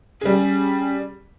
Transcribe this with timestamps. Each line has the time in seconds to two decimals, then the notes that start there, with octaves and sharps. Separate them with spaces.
0.21 G3 C#4 G#4